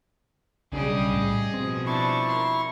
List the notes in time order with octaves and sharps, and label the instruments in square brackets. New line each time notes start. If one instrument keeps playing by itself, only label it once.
[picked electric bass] B1 D4 [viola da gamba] C#3 G3 [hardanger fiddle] G#4 D#5
[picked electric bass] A2
[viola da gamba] B2 F3 [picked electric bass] C4
[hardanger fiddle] D4 [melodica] E4 C#6
[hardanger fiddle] A#4 C6